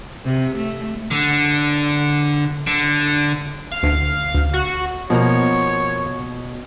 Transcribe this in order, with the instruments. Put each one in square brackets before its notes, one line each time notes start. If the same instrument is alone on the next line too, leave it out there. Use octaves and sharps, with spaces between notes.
[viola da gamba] C3
A3
[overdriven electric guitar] D3
D3
[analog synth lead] F5
[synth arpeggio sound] D2
D2
[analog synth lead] F#4
[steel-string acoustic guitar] B2 [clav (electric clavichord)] F3 A#3 A#5 [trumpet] C#5